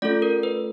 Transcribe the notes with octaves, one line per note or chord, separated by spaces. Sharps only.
A3 C#4 F4 A4 D5
A#4
B4